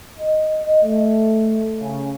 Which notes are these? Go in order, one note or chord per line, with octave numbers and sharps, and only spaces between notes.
D#5
A3
C#3